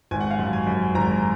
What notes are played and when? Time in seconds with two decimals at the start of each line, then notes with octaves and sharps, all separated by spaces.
0.11 G#1 G#5
0.20 F#5
0.30 F5
0.39 F#2 F#5
0.53 G#5
0.67 F#2
0.95 G#1 A#5